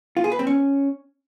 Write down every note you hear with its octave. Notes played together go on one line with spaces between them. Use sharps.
F4
G#4
B4
C4
C#4